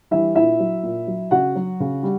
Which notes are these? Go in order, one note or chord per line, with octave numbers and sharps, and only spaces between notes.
E3 G3 E4 E5
A#2 E4 E5
F#3
A#2
F#3
C#3 F#4 F#5
F#3
C#3
G3